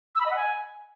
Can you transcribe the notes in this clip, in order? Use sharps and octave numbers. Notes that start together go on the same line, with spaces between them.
E6
B5
D#5
F#5
G#5